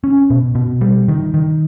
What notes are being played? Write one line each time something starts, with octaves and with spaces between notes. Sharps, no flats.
C#4
B2
B2
G3
D#3
D#3